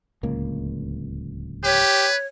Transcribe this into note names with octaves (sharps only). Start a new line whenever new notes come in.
D1 C#2 A#3
G4 B4 C#5